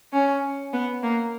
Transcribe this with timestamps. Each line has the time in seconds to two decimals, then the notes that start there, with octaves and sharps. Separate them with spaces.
0.13 C#4
0.74 B3
1.03 A#3